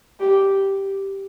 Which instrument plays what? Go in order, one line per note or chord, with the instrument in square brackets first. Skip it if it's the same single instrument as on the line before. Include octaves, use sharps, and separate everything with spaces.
[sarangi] G4